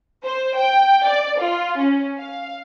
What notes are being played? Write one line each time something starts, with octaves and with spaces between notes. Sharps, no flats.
C5
G5
D5
F4
C#4
F5